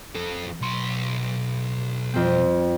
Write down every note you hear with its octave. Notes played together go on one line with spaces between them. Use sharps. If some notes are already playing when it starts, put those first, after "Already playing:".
F2 A4
B1 C6
F2 C4